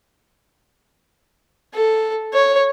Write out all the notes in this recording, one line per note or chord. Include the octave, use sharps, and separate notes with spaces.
A4
C#5